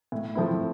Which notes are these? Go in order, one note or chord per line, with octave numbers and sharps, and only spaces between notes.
A2
F3 A3 C4 E4